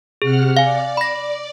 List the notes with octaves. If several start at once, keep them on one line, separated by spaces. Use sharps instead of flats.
C3 G#4 F#5 F6
D5 F5 G#5
B5 A#6